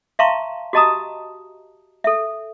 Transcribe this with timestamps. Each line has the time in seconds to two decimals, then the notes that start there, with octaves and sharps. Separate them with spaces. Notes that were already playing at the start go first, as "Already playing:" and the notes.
0.19 E5 F5 A5 A#5 C6 C#6
0.73 F#4 G4 D#5 A5 A#5 D#6
2.04 A4 E5